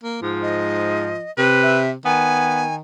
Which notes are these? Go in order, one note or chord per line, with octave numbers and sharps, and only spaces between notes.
A#3
G#2 F3
D#5
C3 B4
E5
D#3 B3 G#5